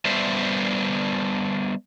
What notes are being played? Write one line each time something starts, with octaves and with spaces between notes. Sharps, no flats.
G3 B3 D4 C5 E5